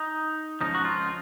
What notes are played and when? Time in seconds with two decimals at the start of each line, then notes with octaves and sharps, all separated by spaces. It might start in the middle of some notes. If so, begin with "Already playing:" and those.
Already playing: D#4
0.61 C#2 C#3 F3 D#4
0.75 F#4
0.85 F4